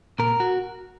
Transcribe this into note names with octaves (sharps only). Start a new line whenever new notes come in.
A#2 A#4
F#4